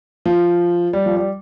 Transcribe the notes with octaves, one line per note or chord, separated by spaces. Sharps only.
F3
G3
F3
G3